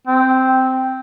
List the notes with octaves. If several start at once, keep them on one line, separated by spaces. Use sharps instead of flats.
C4